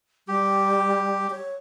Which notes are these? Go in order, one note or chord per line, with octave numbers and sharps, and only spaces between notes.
G3 G4
C#5